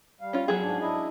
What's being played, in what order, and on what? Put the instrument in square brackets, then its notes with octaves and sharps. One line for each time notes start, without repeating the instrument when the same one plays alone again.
[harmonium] G3 F5
[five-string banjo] C#4 F4
[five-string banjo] F#3 G#4 [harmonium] B3
[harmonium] G#2 D4
D4 E4 D#5